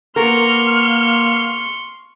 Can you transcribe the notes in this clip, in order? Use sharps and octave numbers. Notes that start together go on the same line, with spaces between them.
A#3 B3 A#4 C6 C#6 F6